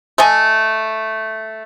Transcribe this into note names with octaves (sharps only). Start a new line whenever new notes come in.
A3 D#5 G#5